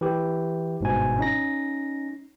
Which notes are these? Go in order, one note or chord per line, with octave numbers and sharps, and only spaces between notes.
E3 G4
G1 G#2 B2 G#5
C#4 D#4 A#6